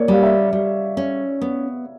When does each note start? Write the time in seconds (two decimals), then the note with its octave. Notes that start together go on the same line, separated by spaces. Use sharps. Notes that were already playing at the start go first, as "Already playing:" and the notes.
Already playing: A#3 C#5 D5
0.08 G3 F5
0.23 E5
0.53 G3
0.97 C#4
1.41 B3